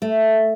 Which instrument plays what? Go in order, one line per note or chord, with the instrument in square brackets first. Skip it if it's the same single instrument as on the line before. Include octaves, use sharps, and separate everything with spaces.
[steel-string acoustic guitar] A3